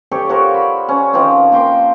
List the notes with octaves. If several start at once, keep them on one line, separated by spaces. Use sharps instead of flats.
G4 A4 C#5 D5
F3 F#4 A#4
B5
C#4
D#3 F3 C4
A#3 G5 C6 D6